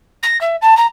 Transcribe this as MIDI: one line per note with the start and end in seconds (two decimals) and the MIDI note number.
0.23 0.39 94
0.41 0.56 76
0.62 0.76 81
0.77 0.86 82